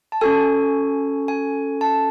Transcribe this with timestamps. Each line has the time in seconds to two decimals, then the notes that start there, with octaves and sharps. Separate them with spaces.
0.12 A5
0.21 C#4 F#4 A4 G#5
1.28 G#5
1.81 A5